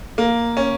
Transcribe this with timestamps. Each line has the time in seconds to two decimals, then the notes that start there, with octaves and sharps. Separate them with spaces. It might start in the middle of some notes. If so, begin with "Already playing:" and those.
0.18 A#3
0.57 C#4